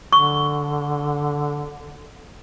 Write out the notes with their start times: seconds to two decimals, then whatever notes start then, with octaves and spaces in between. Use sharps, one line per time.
0.13 D3 C#6